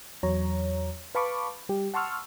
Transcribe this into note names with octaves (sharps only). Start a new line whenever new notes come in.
E2 F#3 C#5 A#5
B4 F5 A5 B5 C#6 D6
G3 G4
F#5 A5 C6 C#6 E6 F6